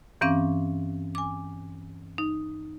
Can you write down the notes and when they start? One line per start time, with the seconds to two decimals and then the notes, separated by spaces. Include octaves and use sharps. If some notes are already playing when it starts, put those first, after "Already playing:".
0.21 G2 E3 C4 C#4 F5 D6
1.15 G#5 D6
2.18 D#4